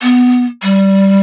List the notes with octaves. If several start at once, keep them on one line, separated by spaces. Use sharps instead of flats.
B3
G3